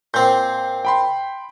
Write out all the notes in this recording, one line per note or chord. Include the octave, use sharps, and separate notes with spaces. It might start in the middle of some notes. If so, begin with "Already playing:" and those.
A#2 C4 G6
G5 B5 C6